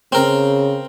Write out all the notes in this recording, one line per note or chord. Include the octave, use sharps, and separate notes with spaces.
C#3 C4 A#4